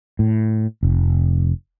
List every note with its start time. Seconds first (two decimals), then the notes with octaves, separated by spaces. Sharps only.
0.19 A2
0.83 F1